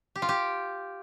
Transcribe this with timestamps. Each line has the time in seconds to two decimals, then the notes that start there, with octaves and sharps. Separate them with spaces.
0.16 G4
0.22 F4
0.29 G4